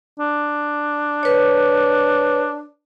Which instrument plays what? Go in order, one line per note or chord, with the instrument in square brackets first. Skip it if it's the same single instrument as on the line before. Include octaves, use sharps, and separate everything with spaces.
[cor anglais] D4
[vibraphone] B4 C#5